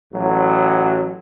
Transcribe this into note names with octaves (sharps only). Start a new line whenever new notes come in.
A1 F#3